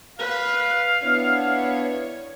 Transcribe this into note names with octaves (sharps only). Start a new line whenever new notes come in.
B4 F5
B3 D4 E4 C#5